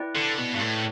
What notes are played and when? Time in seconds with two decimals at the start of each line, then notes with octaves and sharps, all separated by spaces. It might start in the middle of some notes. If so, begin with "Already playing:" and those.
Already playing: E4 B4 D5 G5
0.16 D3
0.38 B2
0.54 G2
0.61 A2